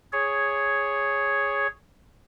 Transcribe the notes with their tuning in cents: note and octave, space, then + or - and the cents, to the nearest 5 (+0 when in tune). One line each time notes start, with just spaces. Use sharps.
G#4 +0 C#5 +0